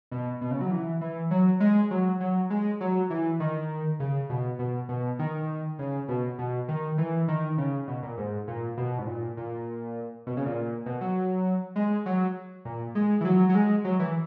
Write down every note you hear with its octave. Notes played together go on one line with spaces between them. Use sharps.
B2
B2
C#3
F#3
E3
E3
F#3
G#3
F#3
F#3
G#3
F#3
E3
D#3
C#3
B2
B2
B2
D#3
C#3
B2
B2
D#3
E3
D#3
C#3
B2
A#2
G#2
A#2
B2
G#2
A#2
A#2
B2
C#3
A#2
B2
F#3
G#3
F#3
A#2
G#3
E3
F#3
F#3
G#3
F#3
E3